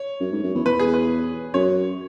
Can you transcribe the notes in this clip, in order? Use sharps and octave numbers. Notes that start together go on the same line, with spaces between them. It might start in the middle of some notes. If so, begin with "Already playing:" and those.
Already playing: C#5
F#2
G#2
F#2
E2
E2 B4
G#4
B4
F#2 C#5